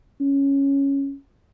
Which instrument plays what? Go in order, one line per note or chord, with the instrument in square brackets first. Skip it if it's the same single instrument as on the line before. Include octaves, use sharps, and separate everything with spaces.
[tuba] C#4